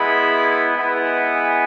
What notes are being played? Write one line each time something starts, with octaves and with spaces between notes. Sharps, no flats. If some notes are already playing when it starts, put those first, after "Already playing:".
Already playing: G#3 B3 E4 B5
G#3 B3 E4
G#5